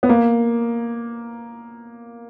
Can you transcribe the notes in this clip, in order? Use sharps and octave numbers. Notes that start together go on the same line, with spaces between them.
B3
A#3